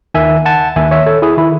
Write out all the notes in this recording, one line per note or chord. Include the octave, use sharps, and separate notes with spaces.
D#2 D#3 E5 G#5
F#5 A5
D#2 D#3 E5 G#5
C#5 E5
A4 C#5
E4 G#4
D#3 E4